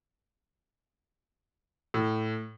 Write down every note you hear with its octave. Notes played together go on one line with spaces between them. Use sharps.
A2